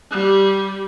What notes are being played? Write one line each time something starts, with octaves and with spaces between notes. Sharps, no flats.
G3 G4